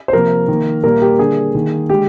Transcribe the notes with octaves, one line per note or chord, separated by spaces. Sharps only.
C5
C3 F3 A#3 A#4
D#3 A#3
A#2 G3 A#3 A#4
G4
D3 G3 A#3 G#4
D#3 A#3
D3 G#3 G4